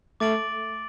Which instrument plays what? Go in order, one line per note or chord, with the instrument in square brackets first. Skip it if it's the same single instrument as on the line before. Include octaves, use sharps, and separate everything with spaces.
[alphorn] A3 [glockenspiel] D6 A6 D7 F#7